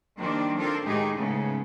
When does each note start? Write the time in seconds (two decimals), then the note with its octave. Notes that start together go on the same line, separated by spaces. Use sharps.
0.18 D#3 F3 G3 A#3 C4 D4
0.57 C4 D4 F4 A4 A#4
0.85 A2 D#3 G#3 D#4 G4 G#4
1.16 G#2 C#3 A3 B3